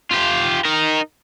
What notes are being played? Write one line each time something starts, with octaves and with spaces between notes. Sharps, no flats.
F4 G4
D#4 A#4